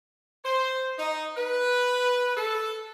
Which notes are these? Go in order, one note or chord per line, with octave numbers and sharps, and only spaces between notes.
C5
D#4
B4
A4